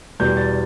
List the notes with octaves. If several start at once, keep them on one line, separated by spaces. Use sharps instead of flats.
E2 B2 G3 G6
A6